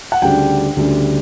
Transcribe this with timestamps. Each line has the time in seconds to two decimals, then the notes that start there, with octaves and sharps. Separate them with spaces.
0.12 F#5
0.22 D2 C#3 G3 D4 G5
0.77 D2 C#3 G3 D4